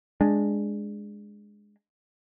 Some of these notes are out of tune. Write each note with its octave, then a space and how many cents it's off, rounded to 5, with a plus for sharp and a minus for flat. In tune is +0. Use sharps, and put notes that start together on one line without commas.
G#3 +0 D4 +0